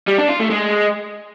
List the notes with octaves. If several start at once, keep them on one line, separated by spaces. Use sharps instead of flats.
G3
D4
F4
A3
G#3